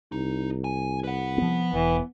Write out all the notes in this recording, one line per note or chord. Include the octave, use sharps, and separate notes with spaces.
C2 D#4
G#5
B4 F#5
F3 B3
E1 E3 B3